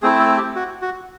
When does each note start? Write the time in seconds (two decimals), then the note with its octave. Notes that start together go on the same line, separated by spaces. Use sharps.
0.02 A3 C4 E4 G#4
0.20 A4
0.37 G4
0.56 F#4
0.82 F#4